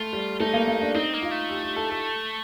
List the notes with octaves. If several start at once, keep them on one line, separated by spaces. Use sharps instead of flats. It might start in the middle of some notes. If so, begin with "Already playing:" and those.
Already playing: A3 F4
G3
A3 D#4
A#3
A#3
D4
C4 D#4
A#3
F4
A3
G4
G4
A4
A4